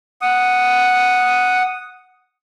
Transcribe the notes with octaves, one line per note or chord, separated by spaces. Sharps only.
F#5 D#6